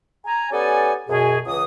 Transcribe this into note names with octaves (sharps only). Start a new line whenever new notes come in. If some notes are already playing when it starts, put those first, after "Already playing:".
G#5 A#5
B3 C#4 G4 A4 D5 G#5
F#2 B2 G#4
C#2 E3 D#6